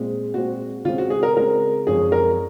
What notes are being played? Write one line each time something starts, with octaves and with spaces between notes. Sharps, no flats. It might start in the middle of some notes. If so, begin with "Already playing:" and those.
Already playing: A#2 G#3 C4
A#2 G#3 C4 F#4
C#3 G#3 C4 F4
F#4
G#4
A#4
C#3 G#3 C4 A#4
F#2 F3 G#3 C4 G#4
A#4